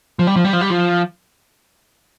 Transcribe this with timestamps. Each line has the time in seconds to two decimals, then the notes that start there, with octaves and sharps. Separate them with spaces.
0.19 F3
0.27 G3
0.36 F3
0.45 G3
0.53 F3
0.61 G3
0.70 F3